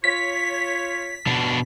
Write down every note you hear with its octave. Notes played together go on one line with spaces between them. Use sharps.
F4 C#5 B6
B2 D4